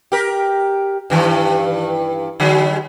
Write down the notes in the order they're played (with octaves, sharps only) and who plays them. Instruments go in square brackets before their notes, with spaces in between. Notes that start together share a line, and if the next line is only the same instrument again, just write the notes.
[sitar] G4 A#4
G2 D#3 E3
D3 F#3 G#3